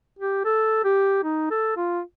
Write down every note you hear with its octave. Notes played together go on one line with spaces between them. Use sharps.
G4
A4
G4
D#4
A4
F4